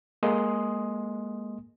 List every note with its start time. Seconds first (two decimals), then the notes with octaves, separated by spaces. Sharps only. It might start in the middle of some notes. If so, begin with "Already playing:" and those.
0.23 G#3 A#3 D#5 G#5 C6 D#6